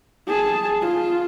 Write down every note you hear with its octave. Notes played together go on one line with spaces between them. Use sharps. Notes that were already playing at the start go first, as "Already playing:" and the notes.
G#4 A5
F4